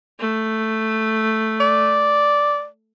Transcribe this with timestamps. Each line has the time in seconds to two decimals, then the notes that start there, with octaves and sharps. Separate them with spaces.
0.20 A3
1.60 D5